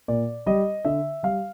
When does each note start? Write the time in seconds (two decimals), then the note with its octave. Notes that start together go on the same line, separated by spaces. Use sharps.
0.08 A#2 D5
0.46 G3 D#5
0.85 D3 E5
1.23 G3 F5